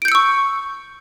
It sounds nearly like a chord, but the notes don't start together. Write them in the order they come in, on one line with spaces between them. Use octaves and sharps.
D7 G6 C#7 E6 C#6